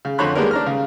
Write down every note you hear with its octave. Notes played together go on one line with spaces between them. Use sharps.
C#3
F2 D3 C5 C#5 B5 F#6
G3 G#3 A#3 B3 D4 A#4
D4 A#5 F6
C#3